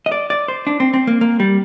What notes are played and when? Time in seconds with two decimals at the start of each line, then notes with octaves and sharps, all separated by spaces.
0.06 D#5
0.12 D5
0.30 D5
0.48 C5
0.67 D4
0.80 C4
0.94 C4
1.07 A#3
1.21 A#3
1.40 G3